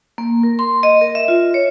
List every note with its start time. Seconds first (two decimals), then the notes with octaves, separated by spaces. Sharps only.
0.18 A#3
0.43 A#4
0.59 C6
0.83 D#5
1.01 A#4
1.15 E5
1.28 F4
1.54 C#5